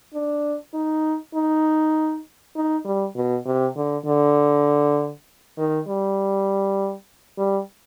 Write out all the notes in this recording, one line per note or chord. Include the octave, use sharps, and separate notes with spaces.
D4
D#4
D#4
D#4
G3
B2
C3
D3
D3
D#3
G3
G3